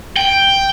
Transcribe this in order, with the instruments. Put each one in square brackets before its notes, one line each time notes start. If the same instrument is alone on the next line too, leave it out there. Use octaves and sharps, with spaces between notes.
[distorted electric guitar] G5